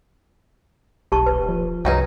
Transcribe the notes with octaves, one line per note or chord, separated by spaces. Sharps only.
D#1 B1 G4 A5 C#6
D#1 B4
F3
C2 F#2 F#3 D#4 G#4 B4 G5